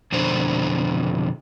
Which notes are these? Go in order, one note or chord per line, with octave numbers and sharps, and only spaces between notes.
F2 B2 D3 D4 C5